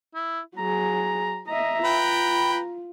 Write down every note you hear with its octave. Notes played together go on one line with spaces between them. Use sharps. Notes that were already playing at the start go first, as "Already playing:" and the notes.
E4
F#3 G#4 A#5
D#5 E5 A#5
F4 B4 G5